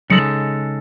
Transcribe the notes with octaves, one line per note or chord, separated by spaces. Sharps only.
C#3 F#3 G#3 D#4 A4